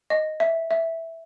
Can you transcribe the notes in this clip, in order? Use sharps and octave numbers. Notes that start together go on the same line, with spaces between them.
D#5
E5
E5